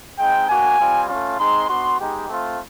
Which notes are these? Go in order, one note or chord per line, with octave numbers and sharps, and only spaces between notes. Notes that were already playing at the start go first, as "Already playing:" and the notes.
G#3 C4 D#4 G5
A#3 D4 F#4 G#5
G3 C4 F4
A3 C#4 F4
G#3 C4 D#4 C6
B3 D4 F#4 C6
G#3 B3 D#4 G4
A3 C4 F4